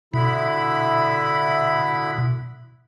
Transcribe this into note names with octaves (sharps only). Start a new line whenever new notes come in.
B2 D3 E4 B5